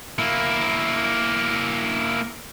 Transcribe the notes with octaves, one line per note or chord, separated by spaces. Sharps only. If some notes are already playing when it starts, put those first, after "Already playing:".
A#3 E4